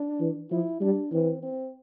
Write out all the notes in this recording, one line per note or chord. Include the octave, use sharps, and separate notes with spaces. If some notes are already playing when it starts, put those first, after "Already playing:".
Already playing: D4
E3
F3 E4
G3 D4
E3 C4
C4